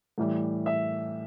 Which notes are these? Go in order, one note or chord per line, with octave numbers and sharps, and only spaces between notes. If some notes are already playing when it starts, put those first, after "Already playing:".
A2 E3 G3
E5